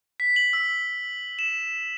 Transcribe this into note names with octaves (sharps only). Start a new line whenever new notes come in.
B6
F#7
E6
E7